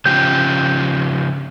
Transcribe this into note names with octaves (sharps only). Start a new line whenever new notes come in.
C#3 F3 G4 G6